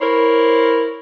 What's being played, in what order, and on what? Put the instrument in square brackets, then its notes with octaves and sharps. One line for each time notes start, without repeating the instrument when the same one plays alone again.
[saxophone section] E4 A#4 C5 C#5